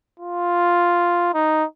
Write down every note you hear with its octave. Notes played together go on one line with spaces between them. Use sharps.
F4
D#4